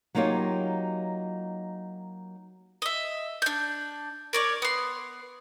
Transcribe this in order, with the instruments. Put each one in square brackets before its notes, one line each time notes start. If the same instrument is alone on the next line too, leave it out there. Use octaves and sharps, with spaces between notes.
[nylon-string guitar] F#3 A#3 D#4 F4 G4 C#5
[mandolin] D#5 E5
D4 G6
A#4 C#5 D5
B3 C6